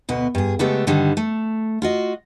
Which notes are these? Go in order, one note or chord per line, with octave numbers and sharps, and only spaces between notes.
D2 B2 B3
G2 G#4
C#3 G#3 A3 B3 G4 A4
G2 D3 D#3 G3
A3
F4 F#4 D#5